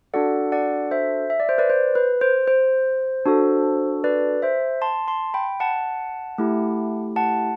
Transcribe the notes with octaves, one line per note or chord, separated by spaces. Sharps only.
D4 F#4 A4 D5 F#5
D5 F#5
C5 E5
E5
D5
C5
B4 D5
C5
B4
C5
C5
D4 F#4 A4
B4 D5
C5 E5
A5 C6
A5 C6
G5 B5
F#5 A5
A3 E4 G4
F#5 A5